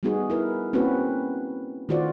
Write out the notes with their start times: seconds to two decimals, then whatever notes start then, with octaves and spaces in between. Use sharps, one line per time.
0.03 G3 A3 B3 D#4 F#4 G#4
0.30 E4 A#4 B4
0.73 A#3 C4 C#4 E4 F#4 B4
1.89 D#3 A3 F4 F#4 C5 D5